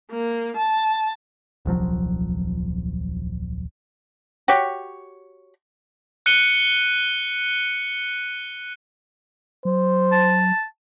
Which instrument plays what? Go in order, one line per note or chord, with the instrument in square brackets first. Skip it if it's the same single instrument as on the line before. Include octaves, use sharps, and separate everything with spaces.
[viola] A#3
A5
[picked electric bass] D#1 C2 F3 F#3
[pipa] F#4 G4 C#5
[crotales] F#6 C#7 D#7 G7
[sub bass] F#3 [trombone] C5
[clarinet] A5